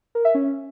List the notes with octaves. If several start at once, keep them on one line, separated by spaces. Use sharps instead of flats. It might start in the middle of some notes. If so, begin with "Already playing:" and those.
A#4
E5
C#4